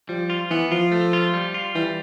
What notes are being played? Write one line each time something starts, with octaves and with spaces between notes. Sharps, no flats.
F3 G3
F4
E3 B3
F3 F4
A3
F4
G3
F4
E3 G3